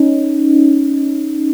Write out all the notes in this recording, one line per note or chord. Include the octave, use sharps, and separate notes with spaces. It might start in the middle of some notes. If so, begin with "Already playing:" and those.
Already playing: C#4 D#4